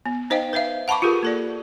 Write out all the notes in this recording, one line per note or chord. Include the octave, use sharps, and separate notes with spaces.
B3
D#4 C5 D#5 F5 G5
B4 C5 E5 F5
F#5 A5 B5 C#6 D6
F4 G4 G#4 A#4 B4
A#3 A4 D5